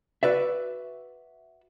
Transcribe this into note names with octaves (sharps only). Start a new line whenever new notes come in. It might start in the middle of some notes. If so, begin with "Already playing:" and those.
F#4 B4 D5 E5